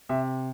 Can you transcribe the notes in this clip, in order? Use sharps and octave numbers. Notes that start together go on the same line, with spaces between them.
C3 E5